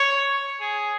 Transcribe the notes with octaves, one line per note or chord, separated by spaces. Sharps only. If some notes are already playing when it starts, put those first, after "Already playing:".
Already playing: C#5
G#4